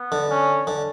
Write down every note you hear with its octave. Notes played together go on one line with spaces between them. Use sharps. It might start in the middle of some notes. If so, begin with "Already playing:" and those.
Already playing: B3
D3
C#4
D3